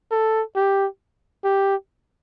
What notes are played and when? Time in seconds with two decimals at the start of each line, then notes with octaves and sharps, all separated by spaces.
0.12 A4
0.56 G4
1.45 G4